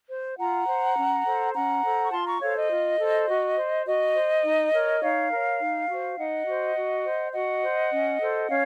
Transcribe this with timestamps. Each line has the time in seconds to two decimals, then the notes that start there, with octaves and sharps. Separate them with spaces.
0.09 C5
0.37 F4 F#5 A#5
0.67 C5
0.96 C#4
1.25 A4 C5
1.54 C#4 F#5 A#5
1.83 A4 C5
2.04 C#6
2.11 F4 A5 C6
2.26 A#5 C#6
2.41 A4 C5 C#5 F5
2.56 D#5
2.69 F4
2.99 A4 C5
3.28 F#4
3.56 C5
3.86 F#4 D#5
4.14 C5
4.43 D#4
4.73 A#4 C#5
5.01 D#4 C#5 F5
5.31 A#4 C#5
5.59 D#4
5.89 F#4 C5
6.17 D#4 D#5 F#5
6.46 F#4 C5
6.75 F#4
7.04 C5
7.33 F#4 D#5 F#5
7.62 C5
7.92 C#4
8.20 A4 C5
8.49 C#4 C#5 F5